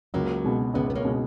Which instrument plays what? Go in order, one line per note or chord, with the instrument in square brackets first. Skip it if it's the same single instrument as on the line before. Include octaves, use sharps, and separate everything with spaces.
[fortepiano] C#2 [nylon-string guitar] F#3 A#3
[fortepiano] B2 G#3
[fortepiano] C#2 [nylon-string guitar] G#3 B3
[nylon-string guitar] B3
A#3 C#4
[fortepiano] B2 G#3